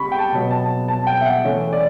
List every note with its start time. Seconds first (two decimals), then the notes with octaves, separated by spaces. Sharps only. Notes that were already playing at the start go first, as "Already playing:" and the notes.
Already playing: C#3 G3 B5 C#6
0.12 G5
0.19 A5
0.32 B2 F#3 B3
0.51 A5
0.88 A5
1.07 G5
1.21 E5
1.26 F#5
1.44 C#3 E3 A3 C#4
1.73 D5